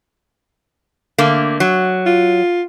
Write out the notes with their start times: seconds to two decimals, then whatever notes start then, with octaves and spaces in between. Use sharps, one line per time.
1.18 D3 A3 A#3
1.60 F#3
2.06 F4